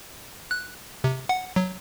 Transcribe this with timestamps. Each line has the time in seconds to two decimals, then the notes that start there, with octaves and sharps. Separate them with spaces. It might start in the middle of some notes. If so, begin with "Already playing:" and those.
0.51 F#6
1.04 C3
1.29 F#5
1.56 F#3